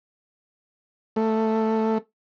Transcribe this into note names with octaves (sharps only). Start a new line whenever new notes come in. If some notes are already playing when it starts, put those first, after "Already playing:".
A3